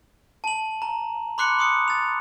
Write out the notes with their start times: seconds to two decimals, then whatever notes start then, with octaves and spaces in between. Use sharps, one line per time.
0.44 A5 F#7
0.82 A#5
1.38 B5 C6 D6 F#6 C7 C#7
1.59 C6 D#6 C#7
1.88 A6 F7